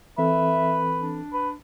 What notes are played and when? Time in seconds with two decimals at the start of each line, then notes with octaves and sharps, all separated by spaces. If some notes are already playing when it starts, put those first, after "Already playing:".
0.18 E3 C4 A4 B4 E5
1.01 D4
1.33 B4